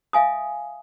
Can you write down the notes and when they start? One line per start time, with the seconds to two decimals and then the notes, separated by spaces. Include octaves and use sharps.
0.13 E5 F5 G#5 D#6